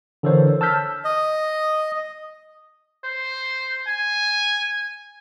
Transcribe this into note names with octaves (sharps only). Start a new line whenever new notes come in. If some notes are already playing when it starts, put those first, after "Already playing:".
D3 E3 A4 A#4 C5 C#5
A5 E6 F6 G6 B6
D#5
C5
G#5